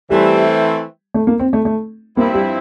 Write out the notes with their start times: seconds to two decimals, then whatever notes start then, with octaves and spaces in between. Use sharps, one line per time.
0.10 E3 G3 A3 C4
1.14 A3
1.27 A#3
1.39 C4
1.53 A3
1.65 A3
2.17 G2 F3 A#3 C4 E4
2.34 G3